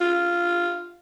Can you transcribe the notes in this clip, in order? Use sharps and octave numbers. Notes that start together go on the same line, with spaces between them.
F4